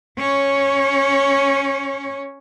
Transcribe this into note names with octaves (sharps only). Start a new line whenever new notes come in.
C#4 C#5